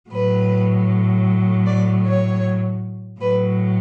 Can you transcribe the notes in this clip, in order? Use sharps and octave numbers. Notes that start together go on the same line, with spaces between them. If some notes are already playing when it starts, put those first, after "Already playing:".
A2 F#3 B4
D5
C#5
A2 F#3 B4